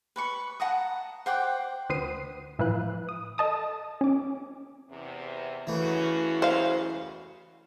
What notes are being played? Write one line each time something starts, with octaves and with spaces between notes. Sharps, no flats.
B4 B5 C#6
F#5 A5 A#5 D#6
C5 F#5 G5 D6
D2 B4 C5 D#6 C7 D#7
A2 E3 F3 B4 F5 F#6
D#6
A4 D#5 A5 D#6
C#4 D6
E2 C3
F#2 C#3 E3 A3 F#4
C5 F5